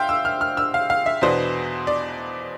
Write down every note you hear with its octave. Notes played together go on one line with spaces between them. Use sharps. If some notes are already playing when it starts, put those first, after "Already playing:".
Already playing: C5 E5 F5 G5
E6
F6
F6
E6
F5
F5
E5
E2 B2 B3 D4 C5
D5